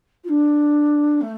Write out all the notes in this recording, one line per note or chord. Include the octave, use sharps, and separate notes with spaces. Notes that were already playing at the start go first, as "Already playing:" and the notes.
F4
D4
A3